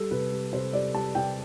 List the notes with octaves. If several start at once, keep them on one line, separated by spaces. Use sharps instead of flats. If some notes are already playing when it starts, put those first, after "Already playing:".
Already playing: G3 A4
C3 B4
G3
C3 C5
G3 D5
G3 A5
C3 G5